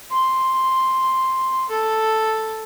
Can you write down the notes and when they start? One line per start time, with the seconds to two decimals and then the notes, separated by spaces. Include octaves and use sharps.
0.11 C6
1.69 A4